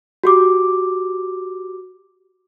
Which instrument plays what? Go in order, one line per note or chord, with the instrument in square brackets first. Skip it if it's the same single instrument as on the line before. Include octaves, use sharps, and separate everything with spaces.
[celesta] F#4 G4 D6